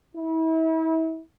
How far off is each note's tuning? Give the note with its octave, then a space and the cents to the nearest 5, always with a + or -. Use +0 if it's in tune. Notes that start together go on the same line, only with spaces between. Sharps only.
E4 -35